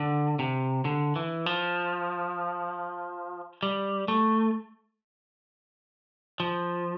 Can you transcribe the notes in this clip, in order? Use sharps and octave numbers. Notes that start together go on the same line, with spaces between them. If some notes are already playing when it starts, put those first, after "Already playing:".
Already playing: D3
C3
D3
E3
F3
G3
A3
F3